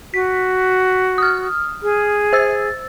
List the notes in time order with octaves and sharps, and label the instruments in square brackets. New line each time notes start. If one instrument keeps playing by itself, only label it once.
[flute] F#4 [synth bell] B6
[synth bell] D#6 F6
[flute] G#4
[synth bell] C5 E6 A6